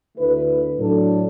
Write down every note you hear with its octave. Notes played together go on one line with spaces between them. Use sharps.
D2 D3 A3 E4 B4
A2 F#3 D4 A4